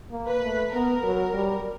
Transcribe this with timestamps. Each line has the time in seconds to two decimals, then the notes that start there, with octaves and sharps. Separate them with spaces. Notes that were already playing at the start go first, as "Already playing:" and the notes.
0.11 A#3
0.26 B4
0.42 A3
0.72 B3 A#4
1.03 F#3
1.33 G3